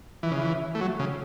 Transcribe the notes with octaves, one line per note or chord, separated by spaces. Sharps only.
E3
C#3
E3
A3
F#3
C#3